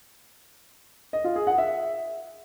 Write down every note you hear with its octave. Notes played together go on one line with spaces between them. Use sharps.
D#5
F4
G#4
F#5
E5